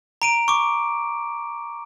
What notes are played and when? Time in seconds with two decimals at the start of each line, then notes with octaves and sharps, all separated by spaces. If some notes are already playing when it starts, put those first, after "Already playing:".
0.22 A#5 D7 D#7
0.48 C#6 D6